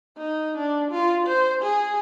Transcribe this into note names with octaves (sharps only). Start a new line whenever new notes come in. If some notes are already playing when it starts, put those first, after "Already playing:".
D#4
D4
F4
C5
G#4